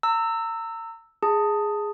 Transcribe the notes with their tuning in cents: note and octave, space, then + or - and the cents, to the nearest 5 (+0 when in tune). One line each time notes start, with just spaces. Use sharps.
A#5 -35 E6 +0
G#4 +0 A5 +15